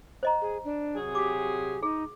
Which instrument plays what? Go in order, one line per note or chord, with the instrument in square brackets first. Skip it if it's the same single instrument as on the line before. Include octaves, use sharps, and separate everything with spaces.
[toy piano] C5 D#5 A#5
[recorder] G#4
D4
[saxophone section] C3 F#3 G#4
[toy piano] F#4 D6 [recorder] G4
[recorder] D#4 [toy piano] G#4